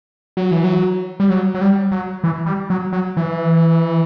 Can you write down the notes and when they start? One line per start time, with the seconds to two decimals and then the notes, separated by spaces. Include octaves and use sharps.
0.37 F#3
0.51 E3
0.64 F#3
1.20 G3
1.30 F#3
1.55 F#3
1.61 G3
1.91 F#3
2.24 E3
2.46 G3
2.70 F#3
2.93 F#3
3.17 E3